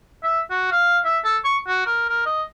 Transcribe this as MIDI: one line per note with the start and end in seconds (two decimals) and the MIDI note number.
0.23 0.40 76
0.51 0.70 66
0.72 0.99 77
1.05 1.18 76
1.25 1.37 69
1.44 1.58 85
1.68 1.83 66
1.86 2.04 70
2.09 2.24 70
2.26 2.43 75